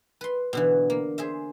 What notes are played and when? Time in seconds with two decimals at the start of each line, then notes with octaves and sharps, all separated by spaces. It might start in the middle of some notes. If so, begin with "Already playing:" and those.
0.21 B4 C6
0.53 B2 D3 E3
0.90 A#3
1.18 G#4 C5 E5